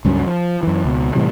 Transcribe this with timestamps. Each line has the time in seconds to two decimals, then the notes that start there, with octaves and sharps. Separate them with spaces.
0.05 C#2 G2 F#3 C#4
0.26 F3
0.63 F#2 E3
0.84 C#2 B2
1.15 A2 C3 E3 G3